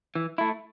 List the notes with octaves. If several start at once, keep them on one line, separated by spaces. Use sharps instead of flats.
E3
A3 E4